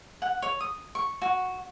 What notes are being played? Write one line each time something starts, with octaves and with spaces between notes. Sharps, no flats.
F#5
C#5
D#6
C#6
F#4